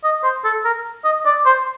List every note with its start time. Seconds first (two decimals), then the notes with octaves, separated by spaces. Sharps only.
0.04 D#5
0.24 C5
0.44 A4
0.65 A#4
1.04 D#5
1.25 D5
1.46 C5